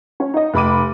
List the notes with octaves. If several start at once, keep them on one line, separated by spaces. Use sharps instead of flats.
C#4
D#4 D#5
F1 B5 D6 D#7